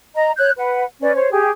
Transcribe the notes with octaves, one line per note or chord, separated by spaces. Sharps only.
D#5 A#5
C#5 F#6 G6
B4 F#5
C#4 B4 D5
C5 C#5
G4 G#4